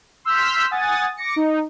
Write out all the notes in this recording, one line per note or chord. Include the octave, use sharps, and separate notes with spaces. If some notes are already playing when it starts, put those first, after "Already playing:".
C6 E6 F6 G6 B6
F#5 G#5 D#6 A6
D6 A#6 C#7
D#4